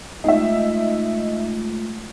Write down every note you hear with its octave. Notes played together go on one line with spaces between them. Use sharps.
G#3 A3 D#4 F4 E5